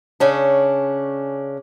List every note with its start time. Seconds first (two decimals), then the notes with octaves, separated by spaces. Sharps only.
0.20 C#3 C#4 D4